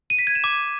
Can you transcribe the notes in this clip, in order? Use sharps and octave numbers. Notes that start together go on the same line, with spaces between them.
D#7
B6
G#6
E7
D6